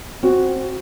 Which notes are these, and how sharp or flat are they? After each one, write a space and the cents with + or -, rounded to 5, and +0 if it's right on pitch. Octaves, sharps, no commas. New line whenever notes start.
C4 +15 F#4 +0